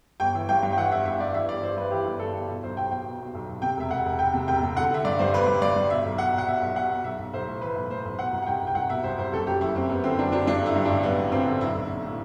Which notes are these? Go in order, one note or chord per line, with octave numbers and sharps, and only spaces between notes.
G1 G5
E3
G2 G5
G2
G5
E3 F#5
G1 E5
G1 E5
G2 D5
E3 E5
G1 D5
E3 C5
G2 B4
E3 G4
G1
G1 A4
G1
B2
B1 C5
B1 G5
B2 G5
B2
B2
B1
B1
C3 G5
E1 E5
E1 F#5
E1
E1 G5
C3
E1 G5
C3
D3 F#5
D3 E5
G2 D5
G2 C5
G1 B4
G2
G2 D5
G2
B2 E5
B1
B2 F#5
B2
F#5
B2 E5
B1
B2 F#5
B2
B1 E5
B1
B1 C5
A2
E3 B4
B1
A2 C5
B1
B2 F#5
C2
F#5
C2 G5
C2
G5
C2 F#5
B2 E5
C2 C5
C2 C5
F#1 A4
F#2 G4
F#1 E4
F#1 C4
F#1 B3
D3 C4
F#2 D4
F#2 D4
G2 D4
D3 E4
G2
D4
A1
G2 B3
G2
A1 C4
D3
B1 E4
B1
B1
A2